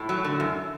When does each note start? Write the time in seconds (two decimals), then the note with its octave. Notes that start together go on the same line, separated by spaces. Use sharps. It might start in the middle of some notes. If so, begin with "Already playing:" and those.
Already playing: A2
0.09 F#3
0.24 D3
0.40 F#2